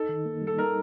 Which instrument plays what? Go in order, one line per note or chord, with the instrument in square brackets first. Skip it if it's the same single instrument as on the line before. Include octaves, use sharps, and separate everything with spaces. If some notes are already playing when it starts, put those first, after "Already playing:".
Already playing: [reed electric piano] D#4 [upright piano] A4
[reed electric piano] D#3
A#3
G3
[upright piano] A4
[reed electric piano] D#4 [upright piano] A#4